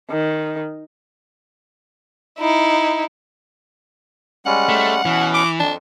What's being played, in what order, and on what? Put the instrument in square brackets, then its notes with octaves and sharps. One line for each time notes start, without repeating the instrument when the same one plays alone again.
[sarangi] D#3
[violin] D#4 E4
[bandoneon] G3 G#3 C#4 [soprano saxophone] F#5
[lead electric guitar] A3
[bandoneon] B2 C#4 [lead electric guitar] E3
[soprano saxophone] D6
[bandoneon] F2 [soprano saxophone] D4